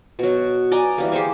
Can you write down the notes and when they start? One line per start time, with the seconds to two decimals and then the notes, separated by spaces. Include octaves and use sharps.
0.19 B2 F#3
0.72 D5 D#5 G#5 A#5
0.98 E3 G3 A#3
1.12 G4 G#4 C5 G#5